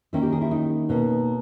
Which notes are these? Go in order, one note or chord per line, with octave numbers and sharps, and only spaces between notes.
D#3 A#3 C#4 E4
G4
G#4
E4
D#4
B2 A#3 C#4